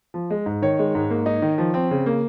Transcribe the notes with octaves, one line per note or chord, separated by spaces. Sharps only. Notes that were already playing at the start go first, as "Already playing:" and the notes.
F3
G#3
G#2
D#3 C#5
G#3
G#2
A#3
D#4
D#3
F3
C4
C#3
A#3